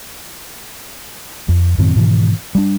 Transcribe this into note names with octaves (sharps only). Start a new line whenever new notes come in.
F2
F#2 A2 D#3 C4
G#2 B2 D#3 E3
G3 A3 D4